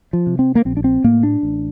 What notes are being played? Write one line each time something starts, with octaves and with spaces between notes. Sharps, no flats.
F3
C3
C4
A#3
A#1 C4
D4
C4
A2 A#3
D4
A1